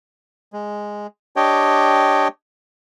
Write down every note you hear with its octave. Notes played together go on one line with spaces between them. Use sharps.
G#3
D4 G4 C#5 D#5 G5